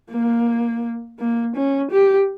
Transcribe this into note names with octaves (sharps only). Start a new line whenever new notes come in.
A#3
A#3
C#4
G4